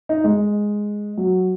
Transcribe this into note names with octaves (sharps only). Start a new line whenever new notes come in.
D#4
G#3
F#3